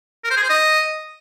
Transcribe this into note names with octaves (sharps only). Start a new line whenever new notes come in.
A#4
C5
G#4
C5
D#5